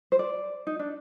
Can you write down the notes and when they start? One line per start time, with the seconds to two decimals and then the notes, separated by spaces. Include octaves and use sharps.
0.12 C5
0.19 D5
0.67 D#4
0.79 D4